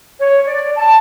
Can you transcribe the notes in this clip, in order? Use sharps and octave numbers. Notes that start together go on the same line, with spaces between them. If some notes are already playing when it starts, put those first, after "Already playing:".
C#5
D5
A5